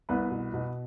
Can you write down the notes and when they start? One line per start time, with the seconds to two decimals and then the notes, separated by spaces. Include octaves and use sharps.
0.09 C2 B3 B4
0.31 B2
0.54 B2